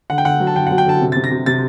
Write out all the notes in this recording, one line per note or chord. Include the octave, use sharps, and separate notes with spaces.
D3 F#5
G5
D3 F#5
F#3
A5
D3 G5
F#3 F#5
G5
D3 A5
C3
C3 A6
A#6
C3
C3 A6